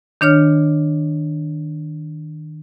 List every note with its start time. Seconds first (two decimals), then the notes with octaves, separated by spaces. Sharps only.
0.21 D#3 D4 C#5 F6